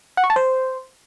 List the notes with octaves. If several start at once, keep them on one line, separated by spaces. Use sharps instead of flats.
F#5
C#6
A5
C5